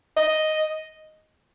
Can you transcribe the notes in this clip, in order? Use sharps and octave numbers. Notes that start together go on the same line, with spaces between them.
D#5